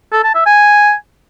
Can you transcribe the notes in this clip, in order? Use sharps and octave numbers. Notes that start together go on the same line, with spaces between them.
A4
A5
E5
G#5